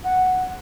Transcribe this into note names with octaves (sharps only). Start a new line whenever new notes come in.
F#5